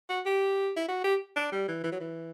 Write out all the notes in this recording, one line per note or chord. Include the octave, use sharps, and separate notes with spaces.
F#4
G4
E4
F#4
G4
D4
G3
E3
E3
F#3
E3